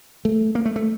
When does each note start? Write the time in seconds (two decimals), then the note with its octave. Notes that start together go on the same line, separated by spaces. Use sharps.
0.25 A3
0.55 A#3
0.65 A3
0.76 A3